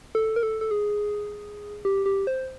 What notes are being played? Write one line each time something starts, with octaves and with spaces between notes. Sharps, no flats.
A4
A#4
A4
A4
G#4
G4
G4
C5